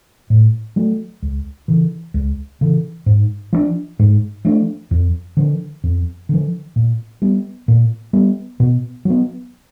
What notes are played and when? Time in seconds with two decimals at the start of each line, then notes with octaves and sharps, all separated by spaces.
0.30 A2
0.76 F#3 A3
1.22 C#2
1.68 C#3 E3
2.14 C#2
2.61 C#3 E3
3.06 G#2
3.53 F3 A3 D4
3.99 G#2
4.45 F3 A3 D4
4.91 F2
5.37 D3 F3
5.84 F2
6.29 D3 F3
6.76 A#2
7.22 G3 B3
7.68 A#2
8.13 G3 B3
8.60 B2
9.05 F#3 B3